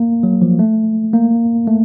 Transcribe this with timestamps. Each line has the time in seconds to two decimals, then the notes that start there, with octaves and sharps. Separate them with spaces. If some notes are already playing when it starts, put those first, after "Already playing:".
Already playing: A#3
0.23 F#3
0.42 F3
0.59 A3
1.13 A#3
1.67 A3